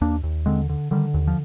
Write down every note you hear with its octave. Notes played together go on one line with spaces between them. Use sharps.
D#2 A#3 D4
D#2
D3 G#3 C4
D3
D3 D#3 G3
D#2
F3